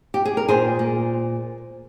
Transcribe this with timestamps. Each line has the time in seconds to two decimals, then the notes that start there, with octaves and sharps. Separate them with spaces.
0.14 G4
0.25 G#4
0.37 A#4
0.48 A#2 G#4 C5
0.79 A#2